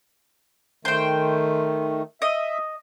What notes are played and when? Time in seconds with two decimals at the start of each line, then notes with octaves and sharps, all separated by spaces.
0.85 D#3 A3 C5 G5
2.22 D#5 E5